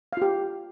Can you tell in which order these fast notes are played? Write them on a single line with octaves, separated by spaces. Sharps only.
F5 F4 G4